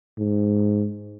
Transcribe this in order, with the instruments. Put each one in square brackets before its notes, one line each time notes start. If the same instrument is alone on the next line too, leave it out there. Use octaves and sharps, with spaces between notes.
[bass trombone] G#2